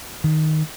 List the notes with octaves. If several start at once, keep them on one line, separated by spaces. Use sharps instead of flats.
D#3